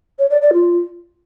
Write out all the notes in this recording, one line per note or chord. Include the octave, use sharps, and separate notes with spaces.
C#5
D5
D5
F4